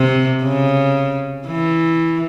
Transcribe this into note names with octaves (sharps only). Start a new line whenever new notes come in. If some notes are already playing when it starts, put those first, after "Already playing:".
Already playing: C3
C#3
E3